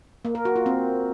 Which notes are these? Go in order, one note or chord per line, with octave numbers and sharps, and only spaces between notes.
A#3
A#4
F#4
F4
C4